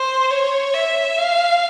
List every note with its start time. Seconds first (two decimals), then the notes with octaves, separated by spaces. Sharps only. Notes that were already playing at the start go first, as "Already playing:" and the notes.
Already playing: C5
0.30 C#5
0.74 E5
1.18 F5